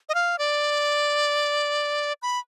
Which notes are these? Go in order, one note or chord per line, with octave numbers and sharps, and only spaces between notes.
D#5
F5
D5
B5